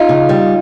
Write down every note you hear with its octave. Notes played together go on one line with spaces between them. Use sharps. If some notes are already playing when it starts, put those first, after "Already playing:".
Already playing: D#4 F4
C#3
G3